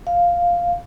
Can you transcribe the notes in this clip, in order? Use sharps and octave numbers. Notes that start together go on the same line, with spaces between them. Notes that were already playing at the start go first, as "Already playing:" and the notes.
F5